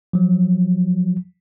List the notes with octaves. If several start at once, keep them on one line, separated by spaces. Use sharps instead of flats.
F3 F#3